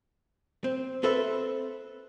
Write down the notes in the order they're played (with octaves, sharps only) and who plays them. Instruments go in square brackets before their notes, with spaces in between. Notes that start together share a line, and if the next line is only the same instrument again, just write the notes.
[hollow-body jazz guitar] C4
C4 A4 B4 E5